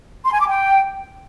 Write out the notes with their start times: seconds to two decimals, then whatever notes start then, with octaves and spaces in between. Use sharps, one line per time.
0.25 C6
0.32 G#5
0.40 D6
0.48 G5